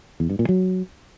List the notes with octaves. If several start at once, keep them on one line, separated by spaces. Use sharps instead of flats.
E2
G2
A#2
F#3